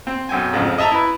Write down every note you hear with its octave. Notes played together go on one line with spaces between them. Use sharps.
C4
B1 F#2 G5 G#5
A1 F2 G#2 C#3 F3
D#5 E5 A5 A#5
E4 B4